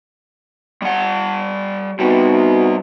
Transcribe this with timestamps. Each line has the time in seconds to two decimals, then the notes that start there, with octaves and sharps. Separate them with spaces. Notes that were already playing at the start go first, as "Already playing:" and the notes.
0.82 G3 F#5
1.99 C3 G3 B3 D#4 F#4